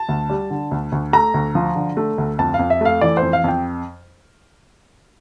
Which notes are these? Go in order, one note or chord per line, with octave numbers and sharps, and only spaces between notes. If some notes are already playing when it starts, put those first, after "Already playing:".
Already playing: A5
D2
G3
D3
D2
D2
A3 A#5
D2
F3
D3
A3
D2
F2 A5
F5
F2
E5
A3 F5
E3 D5
C5
F2
F5
F2 G5